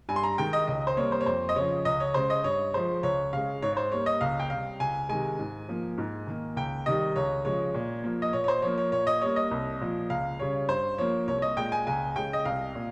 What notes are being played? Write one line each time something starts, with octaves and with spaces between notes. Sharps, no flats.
G2 G#5
C6
A#5
D#3 G#3 G5
D#5
C#2 D#5
C5
C3 G3 A#3 C#5
C5
C#5
F2 C5
D#5
C#3 F3 C#5
C#2 D#5
C#5
C#3 G#3 C5
D#5
G2 C#5
F3 G#3 C5
C#2 C#5
C#3 G#3 F5
G#2 C#5
C#5
C5
G3 A#3 C#5
D#5
C#2 F5
G5
C3 G3 F5
C#2 G#5
C3 D#3 G#3 G#5
G#2
F3 A#3
G#2
D#3 A#3
C#2 G5
C3 D#3 G3 D#5
C#2 C#5
C#3 F3 G#3 C#5
A#2
F3 A#3
D#5
A#2 C#5
C#5
C5
F3 A#3 C#5
C#5
A#2 C#5
D#5
G3 A#3 C#5
D#5
C2
A#2 F3
C#2 F5
C#3 G3 C#5
G2 C5
F3 A#3 C#5
C2 C#5
C#5
D#5
A#2 G#3 G5
G#5
C#2 G#5
C#3 G#3 G5
D#5
C2 F5
A#2